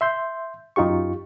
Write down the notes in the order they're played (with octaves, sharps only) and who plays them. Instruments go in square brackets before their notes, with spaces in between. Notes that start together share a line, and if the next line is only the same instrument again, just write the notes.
[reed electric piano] E5 C6 G6
F#2 D#4 F4 G4 C#6